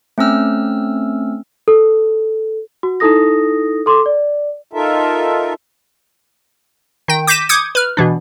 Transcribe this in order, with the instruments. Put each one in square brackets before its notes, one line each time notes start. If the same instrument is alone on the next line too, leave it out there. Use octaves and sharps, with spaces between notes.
[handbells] A3 C4 C#4 E6 F6
[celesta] A4
F#4
D#4 E4 A4 D#6 A#6
A4 C6 D6
D5
[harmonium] D#4 F4 A4 A#4 E5
[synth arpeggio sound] D#3 G5
D6 G6 A#6 B6 D#7 E7
D6 D#6 G6 G#6 C#7
B4 F6
B2 E3 D4